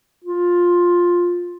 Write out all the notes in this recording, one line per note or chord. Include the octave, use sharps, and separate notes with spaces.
F4